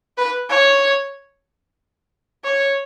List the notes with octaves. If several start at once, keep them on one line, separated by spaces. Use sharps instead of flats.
B4
C#5
C#5